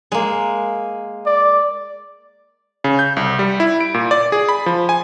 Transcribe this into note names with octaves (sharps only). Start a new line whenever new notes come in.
G#3 A#3
D5
C#3
G6
C2
G3
E4
D7
A#2
D5
G#4
B5
F3
G#5